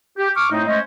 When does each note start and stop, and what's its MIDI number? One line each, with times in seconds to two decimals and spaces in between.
0.19 0.29 67
0.36 0.50 85
0.36 0.50 86
0.36 0.50 89
0.52 0.66 45
0.52 0.66 57
0.52 0.66 60
0.52 0.66 63
0.67 0.80 56
0.67 0.80 57
0.67 0.80 61
0.67 0.80 72
0.67 0.80 75